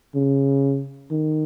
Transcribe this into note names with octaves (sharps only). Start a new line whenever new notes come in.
C#3
D#3